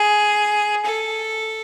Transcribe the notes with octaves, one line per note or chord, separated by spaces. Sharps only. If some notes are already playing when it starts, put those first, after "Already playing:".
Already playing: G#4
A4